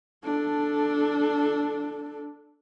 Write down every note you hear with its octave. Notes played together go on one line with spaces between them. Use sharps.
D4 A4